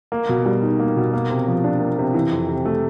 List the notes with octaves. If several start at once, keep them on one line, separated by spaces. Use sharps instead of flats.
A#3
B2
G3
D#4
A#3
B2
A#3
C3
F3
D4
A#3
C3
E3
F2
C3
A3